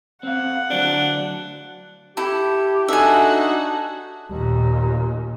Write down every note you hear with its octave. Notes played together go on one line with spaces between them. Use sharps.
C4 F5 F#5
D2 F#3 D4 C5
E4 G4 A4
D4 D#4 F#4 A4 E5 F#5 G#5
D#2 A#2